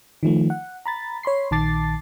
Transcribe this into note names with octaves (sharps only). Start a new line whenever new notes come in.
D#3 F3 A3
F#5
A#5 B5 A6
C#5 B5 C6 C7
A#1 D#3 A5 D6 A6 C7